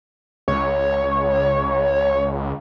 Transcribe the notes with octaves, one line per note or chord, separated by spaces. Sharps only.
C#2 C#5